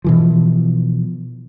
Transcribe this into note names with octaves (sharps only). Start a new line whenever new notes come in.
B2 E3 F3